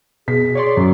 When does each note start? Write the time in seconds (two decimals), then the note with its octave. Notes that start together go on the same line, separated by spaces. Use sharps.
0.28 B2 G#4 B6
0.55 C#5 D5 C6
0.77 F#2